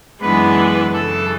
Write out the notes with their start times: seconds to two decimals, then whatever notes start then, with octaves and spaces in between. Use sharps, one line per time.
0.21 F#2 E3 G#3 B3 D4 B4
0.93 F#2 C#3 E3 A4